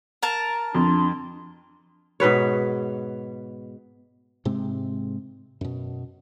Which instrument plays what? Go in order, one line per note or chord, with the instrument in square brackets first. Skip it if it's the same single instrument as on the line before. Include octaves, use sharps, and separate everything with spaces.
[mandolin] A#4 A5
[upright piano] F2 [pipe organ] D4 C6
[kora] G#2 B2 B4 C#5
[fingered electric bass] G#2 C3 G#3 C4
F#2 B2